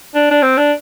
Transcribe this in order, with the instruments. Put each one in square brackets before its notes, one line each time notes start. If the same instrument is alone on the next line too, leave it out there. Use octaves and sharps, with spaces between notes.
[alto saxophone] D4
D4
C4
D4